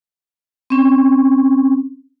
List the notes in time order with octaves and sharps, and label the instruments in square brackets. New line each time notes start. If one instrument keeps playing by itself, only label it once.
[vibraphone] C4 C#4